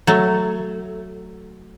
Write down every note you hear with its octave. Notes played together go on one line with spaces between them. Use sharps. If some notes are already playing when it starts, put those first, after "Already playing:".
F#3 A3